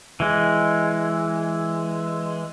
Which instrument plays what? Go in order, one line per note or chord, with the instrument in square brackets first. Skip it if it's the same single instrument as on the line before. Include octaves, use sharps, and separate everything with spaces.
[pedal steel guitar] E3 G#3